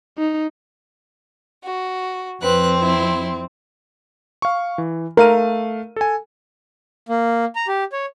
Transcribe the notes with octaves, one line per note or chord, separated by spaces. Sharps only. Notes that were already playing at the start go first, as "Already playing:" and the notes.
D#4
F#4
F2 C4 B4 F#6
E4 C6
F5 C#6
E3
A3 A#4 F5 D#7
A4 G#5
A#3
A#5
G4
C#5